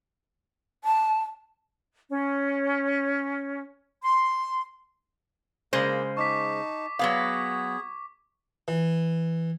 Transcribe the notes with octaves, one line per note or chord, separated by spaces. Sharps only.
A5
C#4
C6
C#3 G#3 A#3 C5
D#4 A5 C#6 D6 B6
F#3 B3 G#4 F5
E3